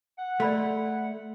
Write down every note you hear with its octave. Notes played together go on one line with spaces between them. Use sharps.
F#5
A3 D5 B5 C6